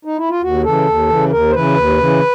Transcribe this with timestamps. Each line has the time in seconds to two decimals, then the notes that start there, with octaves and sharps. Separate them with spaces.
0.05 D#4
0.17 E4
0.29 F4
0.42 D#2 F#4
0.64 C#3 E3 A4
0.87 D#2
1.09 C#3 E3
1.31 D#2 A#4
1.50 C5
1.54 C#3 E3 B4
1.76 D#2
1.98 C#3 E3